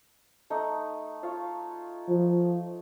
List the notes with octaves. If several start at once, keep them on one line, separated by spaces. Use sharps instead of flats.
A3 D#4
F4 C#5 F5
F3